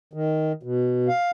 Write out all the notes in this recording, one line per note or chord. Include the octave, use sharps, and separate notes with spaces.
D#3
B2
F5